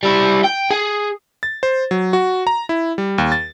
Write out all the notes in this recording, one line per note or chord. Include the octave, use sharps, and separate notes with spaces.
G3 E4
G5
G#4
A6
C5
F#3
F#4
A#5
E4
G3
D#2
A6